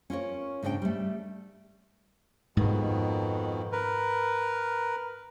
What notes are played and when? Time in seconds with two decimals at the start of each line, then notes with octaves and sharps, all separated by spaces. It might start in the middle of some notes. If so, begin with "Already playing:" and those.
0.10 C#4 F4 A#4 C#5
0.62 G#2 C#3 D4 B4 G5
0.82 G3 A3
2.57 F2 G#2 B2 D#3 G#3
3.72 A#4 B4